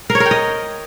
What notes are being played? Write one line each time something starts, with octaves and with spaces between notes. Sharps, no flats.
A#4
C#5
A#4
G5
D#5